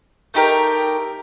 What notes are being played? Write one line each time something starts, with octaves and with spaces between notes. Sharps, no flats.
A3 D#4 G4 A#4